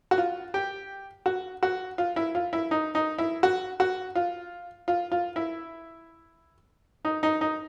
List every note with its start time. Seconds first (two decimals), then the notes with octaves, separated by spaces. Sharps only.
0.11 F#4
0.18 F4
0.54 G4
1.26 F#4
1.63 F#4
1.98 F4
2.16 E4
2.35 F4
2.53 E4
2.71 D#4
2.95 D#4
3.18 E4
3.43 F#4
3.80 F#4
4.15 F4
4.88 F4
5.12 F4
5.36 E4
7.05 D#4
7.23 D#4
7.41 D#4